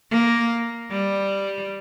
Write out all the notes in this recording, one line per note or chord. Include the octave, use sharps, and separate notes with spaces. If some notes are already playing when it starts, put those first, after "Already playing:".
A#3
G3